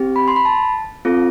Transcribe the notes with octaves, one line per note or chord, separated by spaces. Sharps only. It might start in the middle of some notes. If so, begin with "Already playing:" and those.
Already playing: C4 G4
B5
C6
B5
A5
C4 F4 A4